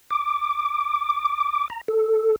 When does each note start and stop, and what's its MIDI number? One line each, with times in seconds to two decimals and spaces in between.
0.10 1.68 86
1.70 1.81 82
1.88 2.36 69